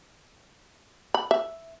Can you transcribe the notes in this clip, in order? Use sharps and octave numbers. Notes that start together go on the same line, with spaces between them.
B5
E5